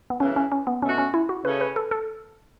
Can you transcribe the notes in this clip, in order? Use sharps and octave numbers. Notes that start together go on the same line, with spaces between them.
B3
F#2 C#3 E3 C#4
C#4
C#4
B3
B2 A3 C#4 F#4
C#4
E4
F#4
C#3 A3 C#4 B4
B4
A4
A4